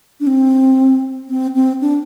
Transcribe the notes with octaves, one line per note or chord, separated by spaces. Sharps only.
D4
C4
C4
C4
D4